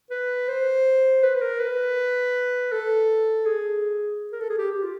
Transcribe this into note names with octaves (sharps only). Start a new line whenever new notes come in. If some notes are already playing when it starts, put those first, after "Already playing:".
B4
C5
B4
B4
A#4
B4
A4
G#4
A#4
A4
G#4
G4
G4
F4